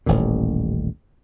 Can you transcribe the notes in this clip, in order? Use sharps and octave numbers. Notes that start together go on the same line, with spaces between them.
D#1 A1 D#2 A#2